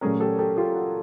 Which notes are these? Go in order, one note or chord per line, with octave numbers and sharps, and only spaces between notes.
A#2 F#3 A3 C#4 G#4 A#4
G4 A4
G4 A4
F4 G4
F#4